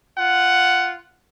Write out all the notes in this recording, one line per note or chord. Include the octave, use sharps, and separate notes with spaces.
F4 F#5